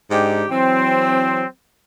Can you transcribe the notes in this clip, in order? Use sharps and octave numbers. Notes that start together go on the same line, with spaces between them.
G#2 D4 D#4 G4
E3 F#3 C4